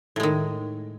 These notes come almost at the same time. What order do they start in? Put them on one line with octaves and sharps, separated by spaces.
A2 G#3 D#3